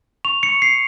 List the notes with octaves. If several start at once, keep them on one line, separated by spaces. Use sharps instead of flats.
C#6 F7
C#7
C#6
C7